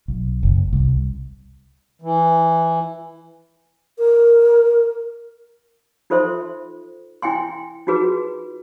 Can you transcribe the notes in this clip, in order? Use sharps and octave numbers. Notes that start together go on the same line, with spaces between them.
B1
F#1
C2
E3
A#4
D#4 F4 A4 C5 E5 C6
E4 G5 G#5 C6
D#4 F4 F#4 G#4 B4